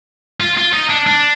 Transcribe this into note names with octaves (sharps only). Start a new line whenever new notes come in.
F4
F4
D#4
D4
D4